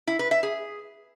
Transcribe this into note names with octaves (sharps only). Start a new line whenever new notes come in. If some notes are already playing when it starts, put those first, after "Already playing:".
E4
B4
E5
G#4